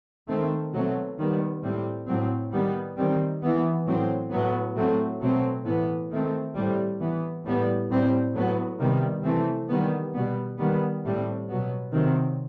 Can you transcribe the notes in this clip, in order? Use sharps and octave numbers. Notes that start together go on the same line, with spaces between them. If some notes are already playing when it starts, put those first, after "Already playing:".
D#3 A3 C4
B2 F#3 A3 C4
D#3 G3 B3
A2 G3 C4
A2 F#3 C4
D#3 G3 B3
D#3 G3 C4
E3 B3
A2 F#3 C4
A2 F#3 B3
A2 F#3 A3 C4
B2 F#3 A3 C4
A2 E3 B3
D#3 A3 C4
A2 G3 C4
E3 B3
A2 G3 B3
A2 G3 C4
A2 F#3 B3
C3 D#3 G3 B3
E3 A3 C4
D#3 G3 B3
B2 G3 B3
D#3 G3 B3
A2 G3 C4
B2 F#3 B3
C3 D#3 F#3 C4